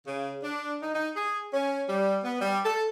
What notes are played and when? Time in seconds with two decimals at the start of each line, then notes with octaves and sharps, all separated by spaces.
0.06 C#3
0.41 D4
0.81 D#4
0.94 D#4
1.15 G#4
1.52 C#4
1.88 G3
2.24 B3
2.40 G3
2.64 A4